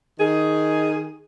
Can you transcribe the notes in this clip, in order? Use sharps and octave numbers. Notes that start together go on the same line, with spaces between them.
D#3 G#4